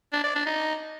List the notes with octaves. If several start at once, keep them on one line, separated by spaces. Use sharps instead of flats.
D4
D5
D4
D#4